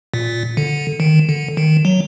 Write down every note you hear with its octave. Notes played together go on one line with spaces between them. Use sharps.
A#2
D3
D#3
D3
D#3
F#3